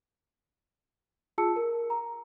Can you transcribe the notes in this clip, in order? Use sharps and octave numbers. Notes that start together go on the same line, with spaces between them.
F4 G#4 A5 E6 C#7
A#4
A#5